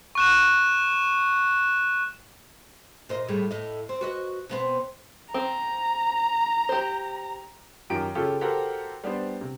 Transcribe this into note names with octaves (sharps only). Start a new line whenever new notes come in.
C#6 F#6 E7
A#2 C5 D#5
A2 G3 G#4
A2 D#5
C4
F#4 B4 D#5
B2 B3 C4
C4 A#5
G4 C5
F#2 D#3 F4 G4 D7
C#3 C#4 F4 G4 A4
F#4 G4 A4 A#4 C5 F#5
G3 B3 D4 C5
C3